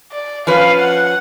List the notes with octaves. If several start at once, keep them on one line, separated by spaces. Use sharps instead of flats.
D5
F3 C#4 B4 F5
F#5